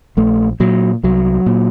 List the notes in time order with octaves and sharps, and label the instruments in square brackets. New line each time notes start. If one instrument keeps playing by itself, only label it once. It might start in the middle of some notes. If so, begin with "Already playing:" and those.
[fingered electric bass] A#1 A3
A#2 F#3
C2 F#3
A#2